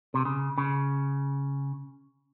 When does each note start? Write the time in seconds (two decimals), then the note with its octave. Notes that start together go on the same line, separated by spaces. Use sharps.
0.14 C3
0.25 C#3
0.58 C#3